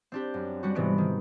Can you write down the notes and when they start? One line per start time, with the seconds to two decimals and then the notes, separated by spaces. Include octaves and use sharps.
0.12 C4 D4 G4
0.34 F#2
0.63 G3 D4 F#4
0.75 G#2 C3 E3 B3 D7
0.98 D#3